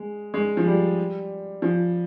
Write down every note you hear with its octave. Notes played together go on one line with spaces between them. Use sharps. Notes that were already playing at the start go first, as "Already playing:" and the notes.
Already playing: G#3
G#3
F3
G3
F3